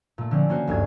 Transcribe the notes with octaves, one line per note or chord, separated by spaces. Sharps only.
A#2 A3
D3 F3 C4 C#4
A#3 C#4 F#4 C5
G1 D2 G2 G#6